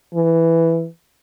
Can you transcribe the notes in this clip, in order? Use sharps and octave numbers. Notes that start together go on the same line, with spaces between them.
E3